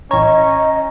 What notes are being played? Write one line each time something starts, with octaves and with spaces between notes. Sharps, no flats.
A1 C#4 C#5 D#5 A#5